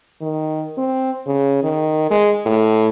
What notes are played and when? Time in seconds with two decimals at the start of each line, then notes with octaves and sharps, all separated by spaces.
0.21 D#3
0.78 C4
1.27 C#3
1.63 D#3
2.10 G#3
2.46 A2